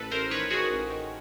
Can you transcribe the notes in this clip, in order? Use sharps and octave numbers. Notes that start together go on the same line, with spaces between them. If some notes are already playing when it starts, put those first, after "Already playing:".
Already playing: A1 A4 B4
A1 A#4 C5
D#3 B4 C#5
D#3 F#4 G#4
A1
D#3